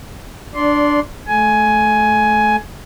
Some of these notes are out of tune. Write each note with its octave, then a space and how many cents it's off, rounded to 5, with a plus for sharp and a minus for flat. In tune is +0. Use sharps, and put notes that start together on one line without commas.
D4 +0 D5 -20 C6 +0
A3 -25 G#5 +10